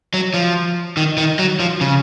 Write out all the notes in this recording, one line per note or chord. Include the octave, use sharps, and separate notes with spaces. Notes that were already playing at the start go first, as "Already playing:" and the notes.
F#3
F3
D#3
D#3
F#3
F3
C#3